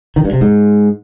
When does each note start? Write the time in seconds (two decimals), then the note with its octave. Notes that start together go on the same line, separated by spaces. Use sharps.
0.16 D#3
0.25 G2
0.33 C3
0.41 G#2